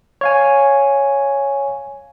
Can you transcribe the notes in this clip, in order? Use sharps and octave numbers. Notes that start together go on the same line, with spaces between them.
C#5 F5 G#5